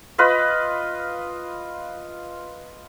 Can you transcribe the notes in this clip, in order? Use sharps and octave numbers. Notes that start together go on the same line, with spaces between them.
F4 B4 D#5 B5